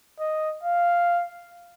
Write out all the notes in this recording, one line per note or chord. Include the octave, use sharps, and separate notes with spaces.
D#5
F5